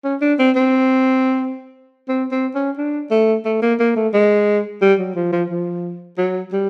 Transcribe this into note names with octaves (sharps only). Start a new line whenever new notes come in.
C#4
D4
C4
C4
C4
C4
C#4
D4
A3
A3
A#3
A#3
A3
G#3
G3
F#3
F3
F3
F3
F#3
G3